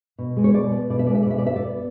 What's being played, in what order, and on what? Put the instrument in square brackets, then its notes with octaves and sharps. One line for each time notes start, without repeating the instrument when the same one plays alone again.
[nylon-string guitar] B2
G#3
C#5
B2 D5
B3
B2 D5
E5
G#3 D5
E5
D5
B2 E5
D5
B3 E5
D5
B3